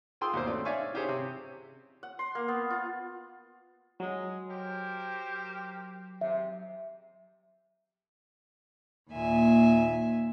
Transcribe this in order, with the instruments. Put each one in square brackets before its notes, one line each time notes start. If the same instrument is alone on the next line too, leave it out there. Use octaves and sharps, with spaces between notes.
[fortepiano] F4 G#4 G5 C6 D#6 E6
D#2 B2 C5
A3 C4 C#4 D5
C#5 D5 E5 F5 G#5 C#6
C#4 E4 G4 G#4 C5 C#5
C3
[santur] F#5
C6
A#3
B3
F4
[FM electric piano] F#3 [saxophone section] G#3
[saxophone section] G4 A#4 C5
[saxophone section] G#2 C3 [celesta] E5
[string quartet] D#2 A#2 E5 G#5